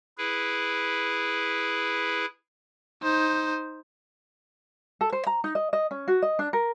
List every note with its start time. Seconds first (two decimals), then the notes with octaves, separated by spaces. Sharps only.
0.18 E4 G#4 B4
3.02 D#4 C5
5.01 A4
5.13 C5
5.27 A#5
5.44 D#4
5.55 D#5
5.73 D#5
5.91 C#4
6.08 F#4
6.22 D#5
6.39 D4
6.53 A#4